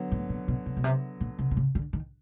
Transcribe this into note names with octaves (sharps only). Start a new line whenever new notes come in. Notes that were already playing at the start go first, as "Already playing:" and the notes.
Already playing: D3 F#3 B3
A2
A#2
B2
B2
B2
C3
A#2
C3
C3
C#3
D3
D#3